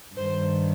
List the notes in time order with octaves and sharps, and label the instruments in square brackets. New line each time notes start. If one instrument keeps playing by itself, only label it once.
[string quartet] G2 D#3 G3 C5